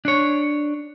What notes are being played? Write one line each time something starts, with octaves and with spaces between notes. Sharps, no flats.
D4 C#5